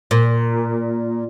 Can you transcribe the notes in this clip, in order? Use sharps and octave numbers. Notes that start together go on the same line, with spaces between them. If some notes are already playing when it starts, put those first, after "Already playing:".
A#2